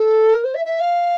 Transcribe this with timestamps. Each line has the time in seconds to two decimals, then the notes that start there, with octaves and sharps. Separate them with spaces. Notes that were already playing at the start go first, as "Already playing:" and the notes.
Already playing: A4
0.33 A#4
0.44 C5
0.54 E5
0.64 E5
0.79 F5